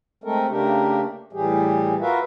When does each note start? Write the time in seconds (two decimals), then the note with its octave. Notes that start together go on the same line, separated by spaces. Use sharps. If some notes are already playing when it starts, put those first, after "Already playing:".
0.24 G#3 A3 C4 A4 A#4
0.49 C#3 A3 A#3 D4 G4 A#4
1.33 A2 E3 G3 G4 G#4
2.00 F4 F#4 A#4 B4 E5 F5